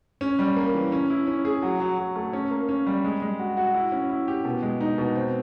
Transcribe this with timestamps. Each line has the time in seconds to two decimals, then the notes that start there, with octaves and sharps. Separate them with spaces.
0.21 C#4
0.39 G3
0.56 A#3
0.74 E3
0.92 C#4
1.10 E4
1.27 C#4
1.45 G#4
1.63 F#3
1.80 F#3
1.98 F#3
2.16 A3
2.33 C#4
2.51 A#3
2.69 C#4
2.86 G3
3.04 G#3
3.22 G#3
3.39 F#4
3.57 F#4
3.74 E4
3.92 C#4
4.10 E4
4.28 G4
4.45 B2
4.62 G#3
4.81 D#4
4.98 B2
5.16 C4